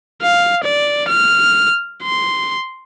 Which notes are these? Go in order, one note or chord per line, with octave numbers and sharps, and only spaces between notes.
F5
D5
F6
C6